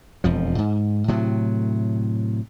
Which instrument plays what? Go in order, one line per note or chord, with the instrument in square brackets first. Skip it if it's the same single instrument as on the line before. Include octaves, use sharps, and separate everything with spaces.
[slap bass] E1 F2 F3
G#2
A2 C3 F#3